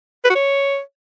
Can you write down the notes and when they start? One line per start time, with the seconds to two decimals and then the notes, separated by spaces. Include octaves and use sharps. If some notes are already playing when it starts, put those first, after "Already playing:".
0.24 B4
0.30 F#4
0.35 C#5